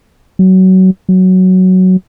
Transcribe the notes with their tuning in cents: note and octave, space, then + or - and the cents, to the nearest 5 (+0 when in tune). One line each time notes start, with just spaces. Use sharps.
F#3 +20
F#3 +5